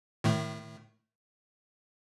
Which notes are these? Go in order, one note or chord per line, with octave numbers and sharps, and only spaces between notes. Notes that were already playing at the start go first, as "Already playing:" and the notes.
A2 D#3 A3